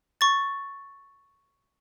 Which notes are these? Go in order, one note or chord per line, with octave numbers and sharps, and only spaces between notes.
C#6 A6